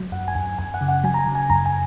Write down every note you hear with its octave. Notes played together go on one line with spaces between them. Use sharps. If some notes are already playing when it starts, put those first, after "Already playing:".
Already playing: F#3
F#2 F#5
G#5
F#2
F#2 G#5
F#5
C#3
F#5
F#3 G#5
A#5
G#5
C#3
G#5
F#2 A#5
G#5